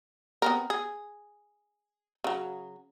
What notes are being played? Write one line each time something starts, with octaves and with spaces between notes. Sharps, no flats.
B3 C4 A#4
G#4
C#3 F#3